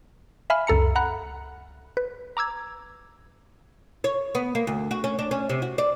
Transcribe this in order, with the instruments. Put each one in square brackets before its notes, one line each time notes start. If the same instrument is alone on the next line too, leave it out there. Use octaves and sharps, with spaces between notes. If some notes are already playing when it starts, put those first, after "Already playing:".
[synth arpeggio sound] E5 F5 G#5 B5 F6
C#2 F#2 A4 A#5 C#7
F#5 A#5 B5 F#6
B4
A#5 D6 E6 G#6
[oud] C#5
B3
A#3
D2
F#4
C#4
D4
C#4
C3
F#4
D5